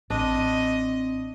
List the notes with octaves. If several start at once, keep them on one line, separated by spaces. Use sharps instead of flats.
A1 C4 D4 D#5